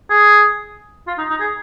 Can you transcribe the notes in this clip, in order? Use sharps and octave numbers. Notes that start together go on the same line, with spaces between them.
G#4
F4
D#4
D#4
G#4